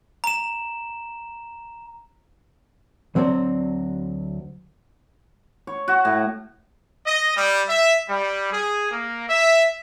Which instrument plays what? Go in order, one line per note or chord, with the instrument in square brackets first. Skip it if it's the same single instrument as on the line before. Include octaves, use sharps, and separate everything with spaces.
[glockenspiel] A#5 E7
[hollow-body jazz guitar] D2 F#3 C4 C5 D5
[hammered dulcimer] C#5
F#4
A2
[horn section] D#5
G3
E5
G3
G#4
A#3
E5